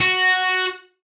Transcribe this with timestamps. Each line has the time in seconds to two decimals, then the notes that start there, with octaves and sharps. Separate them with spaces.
0.01 F#4